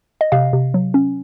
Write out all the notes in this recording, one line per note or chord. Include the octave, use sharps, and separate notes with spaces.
D#5
C3 F5
C3
F#3
C#4